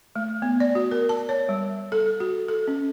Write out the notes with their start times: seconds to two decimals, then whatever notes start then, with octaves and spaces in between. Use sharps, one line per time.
0.16 A3
0.42 B3
0.60 D5
0.75 F#4
0.91 A#4
1.09 A5
1.29 C#5
1.49 G3
1.92 A4
2.20 F#4
2.49 A4
2.68 C#4